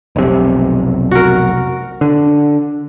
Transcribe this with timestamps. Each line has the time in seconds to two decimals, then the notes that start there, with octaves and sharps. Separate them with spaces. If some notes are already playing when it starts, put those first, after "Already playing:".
0.16 F1 B1 C3
1.11 F#4 A#4
2.01 D3